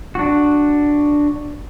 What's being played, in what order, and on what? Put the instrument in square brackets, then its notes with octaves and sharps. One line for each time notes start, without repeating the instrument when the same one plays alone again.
[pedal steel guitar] D4 F#4